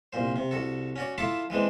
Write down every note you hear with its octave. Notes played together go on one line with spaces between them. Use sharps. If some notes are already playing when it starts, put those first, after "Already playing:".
C2 A#2 C5
C3
C2 F#4 A4
C#4 F#4 D5
E4 F4 A4 E5 C6 D6
E3 G#3 C4 D4